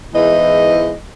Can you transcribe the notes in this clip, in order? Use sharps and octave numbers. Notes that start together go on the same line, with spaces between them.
E2 G#2 E3 D#5